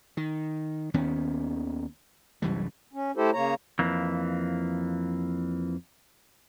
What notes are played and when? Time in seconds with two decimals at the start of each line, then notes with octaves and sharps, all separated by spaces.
0.17 D#3
0.94 D#2 D#3 B3 C#4
2.42 C2 F#2 E3 G3
2.93 C#4
3.17 A3 E4 G4 A4 C5
3.33 C#3 A#3 C#5 A#5
3.79 F2 E3 A#3